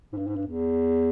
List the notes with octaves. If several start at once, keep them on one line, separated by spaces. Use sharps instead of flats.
G#2
G2
G#2
G2
E2